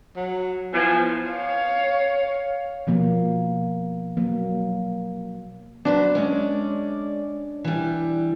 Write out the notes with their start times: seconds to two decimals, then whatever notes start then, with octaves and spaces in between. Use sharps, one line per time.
0.16 F#3
0.74 F3 B3 E4 G#5
1.32 C#5 F5
2.87 B2 F3 A#3
4.17 F#3 A#3
5.85 F#3 D4 B4 C5
6.15 G#3 C#4 D5
7.64 E3 G3